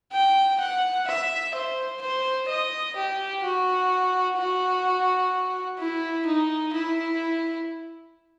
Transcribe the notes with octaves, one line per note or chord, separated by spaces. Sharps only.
G5
F#5
E5
C5
C5
D#5
G4
F#4
F#4
E4
D#4
E4